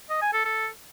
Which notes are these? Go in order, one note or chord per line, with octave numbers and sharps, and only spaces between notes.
D#5
G#5
A4
A4